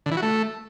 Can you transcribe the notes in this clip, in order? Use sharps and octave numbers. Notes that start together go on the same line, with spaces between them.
D3
E3
F#4
A3